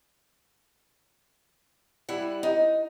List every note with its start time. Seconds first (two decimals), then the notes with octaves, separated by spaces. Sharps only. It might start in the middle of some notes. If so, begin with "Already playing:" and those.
2.08 G3 E4 F#5
2.43 D#4